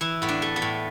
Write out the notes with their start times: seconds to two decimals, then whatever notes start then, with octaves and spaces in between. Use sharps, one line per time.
0.01 E3 E4
0.22 A2 B3
0.28 D4
0.42 A3
0.56 B3
0.62 A2